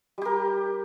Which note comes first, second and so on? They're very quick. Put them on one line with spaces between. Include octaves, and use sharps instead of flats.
G3 G4 A#4